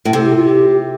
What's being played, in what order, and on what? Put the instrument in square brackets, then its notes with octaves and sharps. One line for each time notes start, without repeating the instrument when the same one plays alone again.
[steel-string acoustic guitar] A2
[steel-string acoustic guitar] C3 [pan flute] A4
[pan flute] G4
F4
G4